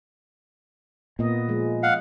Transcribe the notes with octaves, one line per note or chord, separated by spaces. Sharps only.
A#2 B3 D#5
F3 G#3
F5 F#5